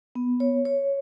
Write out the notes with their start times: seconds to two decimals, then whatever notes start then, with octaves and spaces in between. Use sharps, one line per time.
0.15 B3
0.40 C#5
0.65 C#5